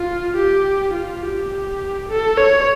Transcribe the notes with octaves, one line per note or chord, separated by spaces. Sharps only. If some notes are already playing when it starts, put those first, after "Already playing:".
Already playing: F4
G4
F4
G4
A4
C#5